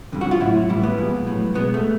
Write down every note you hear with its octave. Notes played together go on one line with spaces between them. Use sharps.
F2 D3 G3
F#4
F4
A2 F#3 E4
A2 E3 G3 E4
B3
A#2 F3 G#3
A2 F#3
B2 G#3 B3
A3